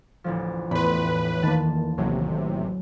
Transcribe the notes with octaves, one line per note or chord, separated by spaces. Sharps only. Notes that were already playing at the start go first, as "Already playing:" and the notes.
A1 D2 F3
E2 A2 B4 B5 C6
D#3 A#3 A5
A1 C3 F#3